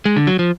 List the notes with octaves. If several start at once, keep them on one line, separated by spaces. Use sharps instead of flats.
G#3
D3
F#3
F3